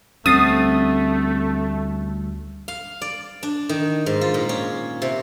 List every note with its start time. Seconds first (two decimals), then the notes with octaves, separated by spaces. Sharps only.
0.26 D2 G3 A3 C4 C#4 D#6 A6 C7
2.68 F5
3.01 D5
3.43 D4
3.69 D#3
4.06 G#2
4.21 F4
4.34 A#2
4.49 C#4
5.02 C3